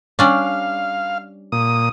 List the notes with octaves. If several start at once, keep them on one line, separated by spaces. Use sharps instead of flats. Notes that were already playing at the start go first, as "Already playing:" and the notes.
G3 C#4 D4 F5
A#2 D#6